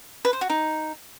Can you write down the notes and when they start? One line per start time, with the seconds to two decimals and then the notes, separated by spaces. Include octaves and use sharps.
0.25 B4
0.33 C5
0.41 F#4
0.50 D#4